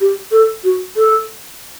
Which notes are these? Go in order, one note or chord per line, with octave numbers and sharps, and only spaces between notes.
G4
A4
F#4
A4